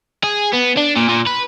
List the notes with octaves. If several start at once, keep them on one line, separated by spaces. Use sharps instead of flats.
G#4
B3
D4
A#2
A#2
B4